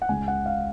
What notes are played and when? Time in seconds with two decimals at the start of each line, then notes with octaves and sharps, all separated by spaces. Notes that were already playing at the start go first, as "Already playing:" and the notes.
0.02 F#5
0.09 C#2 C#3 G#3 G#5
0.28 F#5
0.46 F5